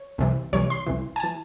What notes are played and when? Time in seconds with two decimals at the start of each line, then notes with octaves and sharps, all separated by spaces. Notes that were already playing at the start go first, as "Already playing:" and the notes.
Already playing: C#5
0.18 C2 C3 E3
0.53 C2 C3 E3 C#5
0.70 C6
0.87 C2 C3 E3
1.16 G#5
1.20 E3 A5